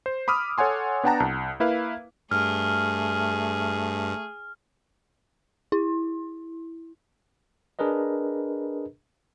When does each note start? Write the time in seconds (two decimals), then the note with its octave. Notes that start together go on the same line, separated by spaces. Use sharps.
0.06 C5
0.28 B5 D6 D#6 F6
0.58 A4 C#5 F#5 G#5 C6
1.04 B3 D4 F#5 G5 A5 A#5
1.20 C2
1.60 A#3 E4 B4 F5
2.31 G2 A3 G#4 F6
5.72 E4
7.79 D4 G#4 A#4 B4 D#5